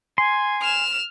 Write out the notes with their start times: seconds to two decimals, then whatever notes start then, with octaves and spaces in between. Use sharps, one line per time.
0.18 G#5 C6
0.62 F6 E7